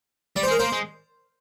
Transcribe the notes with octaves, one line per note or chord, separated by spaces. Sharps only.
G3 D5
C5
G#3
A#4
A#3 C5
G#3